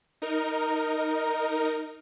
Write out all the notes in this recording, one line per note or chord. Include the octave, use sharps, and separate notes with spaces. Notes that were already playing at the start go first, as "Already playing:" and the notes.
D#4 A#4